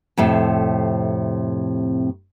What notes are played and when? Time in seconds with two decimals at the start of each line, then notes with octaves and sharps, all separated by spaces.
0.17 F2 A2 C3